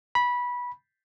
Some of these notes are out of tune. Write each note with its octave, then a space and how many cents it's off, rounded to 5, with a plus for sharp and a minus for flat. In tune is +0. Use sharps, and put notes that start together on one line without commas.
B5 -15